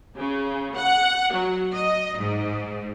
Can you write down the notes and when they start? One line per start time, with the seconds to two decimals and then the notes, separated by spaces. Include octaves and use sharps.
0.16 C#3
0.76 F#5
1.32 F#3
1.74 D#5
2.17 G#2